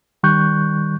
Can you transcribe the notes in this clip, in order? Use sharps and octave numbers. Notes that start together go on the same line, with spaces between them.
D#3 G3 C#6 F#6 G6